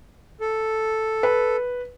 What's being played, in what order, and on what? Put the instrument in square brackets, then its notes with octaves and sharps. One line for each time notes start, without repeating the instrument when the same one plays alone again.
[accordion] A4
[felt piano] B4